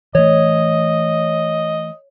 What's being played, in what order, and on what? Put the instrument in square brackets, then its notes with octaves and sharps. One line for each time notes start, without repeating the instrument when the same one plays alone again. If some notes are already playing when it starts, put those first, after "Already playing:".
[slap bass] E3 A3 [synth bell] C#5 [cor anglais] D#5